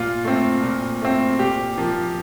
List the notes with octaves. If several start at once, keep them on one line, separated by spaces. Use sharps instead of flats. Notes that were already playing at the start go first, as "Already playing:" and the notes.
Already playing: A#2 F4
A3 C4
A#2
A3 C4
A#2 G4
F3 A#3